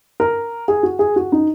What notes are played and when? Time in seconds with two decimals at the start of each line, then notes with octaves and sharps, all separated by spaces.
0.20 A#4
0.68 G#4
0.83 F#4
0.99 G#4
1.16 F#4
1.32 D#4